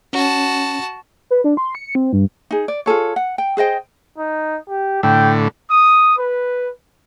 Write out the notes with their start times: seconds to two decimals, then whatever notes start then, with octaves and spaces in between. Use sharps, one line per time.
0.13 C#4 F#4 A5
1.30 B4
1.44 D4
1.57 C6
1.75 C#7
1.95 C4
2.13 G2
2.51 D#4 G#4
2.68 D5
2.86 F4 G#4 A4 C#5
3.16 F#5
3.38 G5
3.57 G#4 C5 D#5 G5
4.18 D#4
4.69 G4
5.03 A2 D3 G5
5.70 D#6
6.18 B4